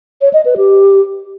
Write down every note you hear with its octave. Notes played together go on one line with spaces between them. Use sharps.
C#5
D#5
B4
G4